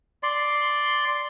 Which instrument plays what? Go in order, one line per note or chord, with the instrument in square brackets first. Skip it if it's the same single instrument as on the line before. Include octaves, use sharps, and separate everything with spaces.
[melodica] D5 C6